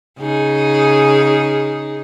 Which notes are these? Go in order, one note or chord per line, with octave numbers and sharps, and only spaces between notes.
C#3 D#4 G#4